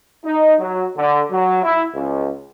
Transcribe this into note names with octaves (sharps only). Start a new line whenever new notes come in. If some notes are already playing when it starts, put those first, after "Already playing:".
D#4
F#3
D3
F#3
E4
C#2